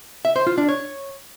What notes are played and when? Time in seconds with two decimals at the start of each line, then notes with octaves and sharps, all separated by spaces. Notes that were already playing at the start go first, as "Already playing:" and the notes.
0.25 E5
0.36 C5
0.47 F4
0.58 D4
0.69 C#5